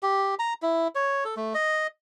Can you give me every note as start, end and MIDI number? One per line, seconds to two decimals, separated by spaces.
0.03 0.35 67
0.39 0.54 82
0.62 0.88 64
0.95 1.24 73
1.25 1.35 69
1.37 1.53 57
1.54 1.87 75